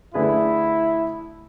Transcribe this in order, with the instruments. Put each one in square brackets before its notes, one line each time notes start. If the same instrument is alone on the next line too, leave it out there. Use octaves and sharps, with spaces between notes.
[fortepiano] D3 A3 D4 G#4 B4 [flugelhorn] E4